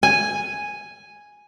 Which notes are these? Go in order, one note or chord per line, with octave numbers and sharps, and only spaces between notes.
G#5